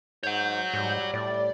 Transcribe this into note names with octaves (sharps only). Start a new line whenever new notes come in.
G#2 C#5 F#5 G6
G#2 G3
A2 D5